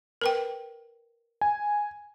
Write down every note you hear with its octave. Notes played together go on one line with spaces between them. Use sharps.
A#4 B4 G5
G#5